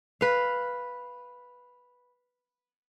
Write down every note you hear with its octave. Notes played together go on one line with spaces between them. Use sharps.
B4 F5